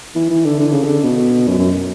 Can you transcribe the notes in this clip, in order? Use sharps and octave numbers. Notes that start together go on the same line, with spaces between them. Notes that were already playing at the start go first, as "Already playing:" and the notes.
E3
E3
D3
D3
C#3
D3
B2
F#2
F#2